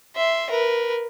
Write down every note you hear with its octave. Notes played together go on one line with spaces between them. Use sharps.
E5 C6
A#4 B4